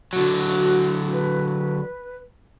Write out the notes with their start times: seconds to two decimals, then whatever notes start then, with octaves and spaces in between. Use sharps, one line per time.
0.13 D3 F#3 F#4
1.13 B4